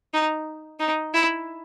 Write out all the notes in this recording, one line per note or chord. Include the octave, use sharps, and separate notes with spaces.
D#4
D#4
E4